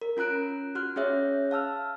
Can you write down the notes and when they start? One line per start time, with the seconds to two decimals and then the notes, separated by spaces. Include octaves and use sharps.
0.02 A#4
0.17 C#4 F4 A#5 F#6 D7
0.75 F#4 F6 F#6
0.96 C#4 G#4 C#5 E5 F#6
1.51 F5 A5 E6 F6